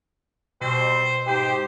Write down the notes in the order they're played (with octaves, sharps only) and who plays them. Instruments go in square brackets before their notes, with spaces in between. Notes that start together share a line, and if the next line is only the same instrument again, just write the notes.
[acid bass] B2 [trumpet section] G3 C4 [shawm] C5
[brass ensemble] G#2 D#4 G4 [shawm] C5 [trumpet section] G5